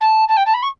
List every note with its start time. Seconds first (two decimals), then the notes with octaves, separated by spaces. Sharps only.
0.01 A5
0.28 A5
0.37 G5
0.46 A5
0.54 B5
0.62 C#6